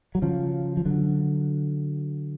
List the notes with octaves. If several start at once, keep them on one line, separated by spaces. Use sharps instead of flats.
F#3
C#3 F3
F3
D3 F#3